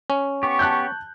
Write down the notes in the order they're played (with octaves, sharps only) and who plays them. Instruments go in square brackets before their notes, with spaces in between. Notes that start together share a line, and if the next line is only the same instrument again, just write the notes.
[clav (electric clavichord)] C#4
[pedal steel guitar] B3 G4 [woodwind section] C#6
[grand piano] A5 F#6 G6